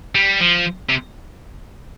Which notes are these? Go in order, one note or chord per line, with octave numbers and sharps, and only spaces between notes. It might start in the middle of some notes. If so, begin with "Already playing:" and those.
G3
F3
C3